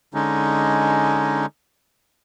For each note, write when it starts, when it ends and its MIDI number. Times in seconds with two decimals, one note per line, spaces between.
0.14 1.46 50
0.14 1.46 56
0.14 1.46 61
0.14 1.46 63